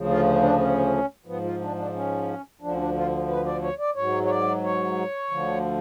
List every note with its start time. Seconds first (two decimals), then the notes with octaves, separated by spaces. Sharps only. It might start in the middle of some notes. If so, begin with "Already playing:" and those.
Already playing: D2 C#3 F3
0.09 F4
0.43 D4
0.59 C#4
1.26 G#2 F3 B3
1.44 F4
1.61 D4
1.77 D4
1.94 C#4
2.62 D2 D3 F3 D4
2.74 C#4
2.78 D4
2.95 F4
3.29 B4
3.45 D5
3.62 C#5
3.79 D5
3.95 G#2 F#3 C#5
4.25 C#5
4.29 D5
4.64 C#5
5.30 D2 D3 F3